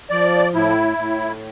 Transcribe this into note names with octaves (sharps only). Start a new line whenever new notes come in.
F3 D5
A2 E4
A2